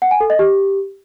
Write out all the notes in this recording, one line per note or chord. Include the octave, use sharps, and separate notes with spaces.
F#5
G#5
A4
D#5
G4